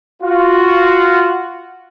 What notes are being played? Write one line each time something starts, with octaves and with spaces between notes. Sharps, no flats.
F4 F#4